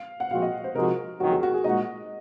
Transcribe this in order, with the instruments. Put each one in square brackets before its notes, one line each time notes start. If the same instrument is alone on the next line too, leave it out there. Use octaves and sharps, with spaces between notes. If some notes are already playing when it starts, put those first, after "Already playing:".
Already playing: [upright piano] F5
F#5
[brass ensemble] A#2 F3 G#3 C4 F#4 [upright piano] F5
[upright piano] D#5
C5
[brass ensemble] C3 F3 G#3 D#4 F#4 [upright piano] A#4
[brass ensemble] F#1 F2 D#3 F#3 [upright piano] F#4
[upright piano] G#4
F#4
G#4
[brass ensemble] A#2 G#3 D#4 F#4 [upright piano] D#5